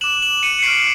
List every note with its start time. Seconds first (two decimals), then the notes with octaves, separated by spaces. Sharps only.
0.01 D6 F#6 E7 F#7
0.22 E7 F#7
0.43 C#7 D#7
0.59 C#7
0.63 C#6 F6 C7 D7